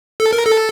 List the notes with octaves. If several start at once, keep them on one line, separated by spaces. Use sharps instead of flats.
A4
A#4
A4